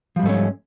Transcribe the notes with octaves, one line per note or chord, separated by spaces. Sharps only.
G#2 F3 G3 A3 C#4